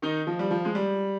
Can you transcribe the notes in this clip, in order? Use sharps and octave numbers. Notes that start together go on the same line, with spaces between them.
D#3 D#4
F3
G3
F3
G#3
G3